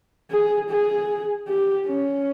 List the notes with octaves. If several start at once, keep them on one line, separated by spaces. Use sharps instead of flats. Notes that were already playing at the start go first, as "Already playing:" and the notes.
G#4
G#4
G4
C#4